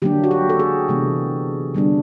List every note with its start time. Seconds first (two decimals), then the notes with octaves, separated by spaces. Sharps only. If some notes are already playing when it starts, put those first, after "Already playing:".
0.02 D3 F#3 A#3 D4 G4
0.24 F#4
0.31 G4
0.49 A4
0.60 G#4
0.88 C3 E3 G#3 B3 D4
1.75 D3 G3 B3 D4